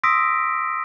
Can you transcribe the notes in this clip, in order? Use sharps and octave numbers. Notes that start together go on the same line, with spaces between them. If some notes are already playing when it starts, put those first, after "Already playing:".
C6 D#6 E6 A#6 B6 D7